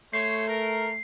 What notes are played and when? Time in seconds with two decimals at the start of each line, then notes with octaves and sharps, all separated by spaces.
0.13 A3 C5 C#5 C7
0.48 A#4